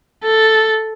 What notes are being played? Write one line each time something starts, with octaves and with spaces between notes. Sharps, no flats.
A4